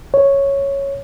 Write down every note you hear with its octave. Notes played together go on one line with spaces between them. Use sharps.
C#5